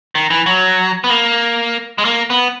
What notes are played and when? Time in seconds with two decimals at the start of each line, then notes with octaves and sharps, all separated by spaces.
0.15 D#3
0.30 E3
0.46 F#3
1.04 B3
1.10 A#3
1.98 G#3
2.05 A#3
2.30 B3